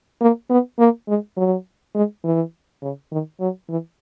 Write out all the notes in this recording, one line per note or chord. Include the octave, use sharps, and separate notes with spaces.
A#3
B3
A#3
G#3
F#3
G#3
E3
C#3
D#3
F#3
E3